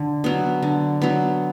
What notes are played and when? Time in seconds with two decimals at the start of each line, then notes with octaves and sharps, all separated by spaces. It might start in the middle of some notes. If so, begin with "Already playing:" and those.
Already playing: D3
0.24 F#3 B3
0.62 D3
1.02 F#3 B3